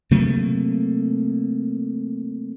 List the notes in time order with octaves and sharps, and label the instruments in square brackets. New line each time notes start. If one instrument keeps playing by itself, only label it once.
[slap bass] C3 F#3 A3 A#3